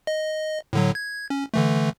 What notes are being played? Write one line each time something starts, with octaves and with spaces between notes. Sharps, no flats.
D#5
A2 D3 F#3
G#6
C#4
D3 E3 A3